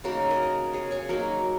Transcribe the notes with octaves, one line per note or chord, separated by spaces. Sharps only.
C#3 A#3 D#4 F#4 A#4
A#4 D#5
G#4 C#5
G#4 C#5
F#3 A#3 D#4 F#4 A#4